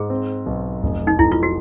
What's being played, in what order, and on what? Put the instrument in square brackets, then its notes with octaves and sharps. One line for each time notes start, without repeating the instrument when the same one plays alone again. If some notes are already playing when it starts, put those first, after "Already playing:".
Already playing: [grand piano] G#2 [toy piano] G#4
[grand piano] C4
B1
F1
[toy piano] D#4
[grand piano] F1 [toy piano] E4
[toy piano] F4
F#4